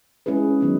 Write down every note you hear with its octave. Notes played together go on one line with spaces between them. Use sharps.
G#3 C#4 E4 G#4 B4
D#3 F#3 B3 D#4